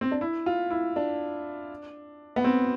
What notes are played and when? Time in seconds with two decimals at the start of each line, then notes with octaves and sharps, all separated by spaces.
0.01 C4
0.11 D4
0.21 E4
0.46 F4
0.70 E4
0.96 D4
2.36 B3
2.44 C4